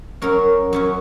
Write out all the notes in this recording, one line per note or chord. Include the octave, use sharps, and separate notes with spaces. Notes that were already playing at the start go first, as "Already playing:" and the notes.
F#2 F#3 C#4 A#4
F#2 F#3 C#4